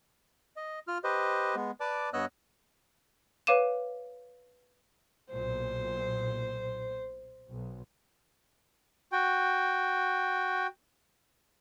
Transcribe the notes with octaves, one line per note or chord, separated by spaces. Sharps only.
D#5
F4 F6
G4 B4 C5 D#5
G#3 B3
B4 D5 A5 D6
G2 B3 C#5 D#5 E6 F#6
B4 C#5 F5 D6 D#7 E7
B1 A#2 C5
B1
F#4 G5